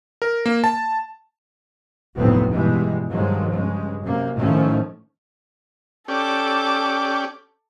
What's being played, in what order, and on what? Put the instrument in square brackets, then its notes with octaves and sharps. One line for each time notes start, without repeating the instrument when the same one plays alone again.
[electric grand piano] A#4
A#3
A5
[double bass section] F1 D2 A2 F#3 B3 C4
G2 B2 E3 G3 G#3
G2 D#3 F3 F#3 G#3
G2 C#3 G#3
F#2 C3 A#3
A2 D#3 F3 A3 C#4
[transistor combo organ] C#4 G4 D5 [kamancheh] A4 D6